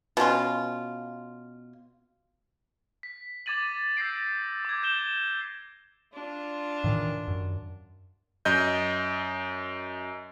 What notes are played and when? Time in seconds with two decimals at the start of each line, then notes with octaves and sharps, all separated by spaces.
0.17 B2 C#4 F4 C6
3.03 B6
3.46 D6 G#6 A6 D#7 F#7
3.97 E6 G6 A#6 C7 D7
4.65 D6 G#6
4.83 G6 E7 G7
6.13 D4 F4
6.84 A2 D#3 E3
7.28 F#2
8.45 F#2 D#5 G6